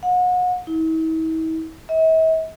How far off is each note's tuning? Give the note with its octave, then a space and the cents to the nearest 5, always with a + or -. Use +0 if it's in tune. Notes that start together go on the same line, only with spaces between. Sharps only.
F#5 -35
E4 -45
E5 -45